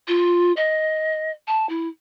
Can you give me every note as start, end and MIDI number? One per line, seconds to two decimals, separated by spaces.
0.08 0.52 65
0.56 1.31 75
1.47 1.67 81
1.69 1.88 64